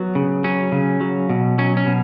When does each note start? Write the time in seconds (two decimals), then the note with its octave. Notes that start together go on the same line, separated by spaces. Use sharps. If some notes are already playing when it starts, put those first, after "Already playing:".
Already playing: F#3 B3
0.15 C#3
0.44 F#3 C#4
0.72 C#3
1.01 F#3
1.29 B2
1.58 F#3 C#4
1.77 C#4
1.86 B2